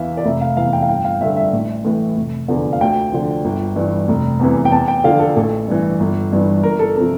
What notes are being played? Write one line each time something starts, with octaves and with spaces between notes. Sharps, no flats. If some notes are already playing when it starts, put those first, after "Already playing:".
Already playing: E2 E3 E5 F5
D5
F1 E5
F5
E2 E3 F5
G5
F5
G1 G5
F5
G2 D3 E5
E5
A1
A2 E3
F1
E2 D3 F3
F5
D2 G5
D3 F3
G1
G2 E3
F1
E2 C3 E3
G5
E2 A5
G5
D3 F3 F5
A4
A1 A4
G2 E3
G1
G2 E3
G1 A#4
A4
C3 F3 A4